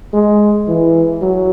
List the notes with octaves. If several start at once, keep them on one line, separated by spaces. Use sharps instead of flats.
G#3
E3
F#3